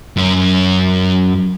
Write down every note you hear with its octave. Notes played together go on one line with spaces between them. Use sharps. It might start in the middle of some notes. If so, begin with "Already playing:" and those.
F#2 C#4